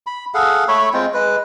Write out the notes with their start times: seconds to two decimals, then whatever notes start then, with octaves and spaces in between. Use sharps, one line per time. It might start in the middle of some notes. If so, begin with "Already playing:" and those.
0.07 B5
0.34 G#4 A4 F5 F#5
0.68 A3 C#5 B5 C#6
0.93 G#3 C4 F4 G5
1.14 G#3 B4